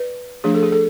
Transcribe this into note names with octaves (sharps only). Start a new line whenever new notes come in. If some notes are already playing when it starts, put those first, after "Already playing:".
Already playing: B4 D5
F3 A3 D4 G#4
A4
G#4
A4